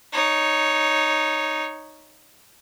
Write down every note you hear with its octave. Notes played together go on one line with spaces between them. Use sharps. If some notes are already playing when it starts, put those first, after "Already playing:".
D#4 C#5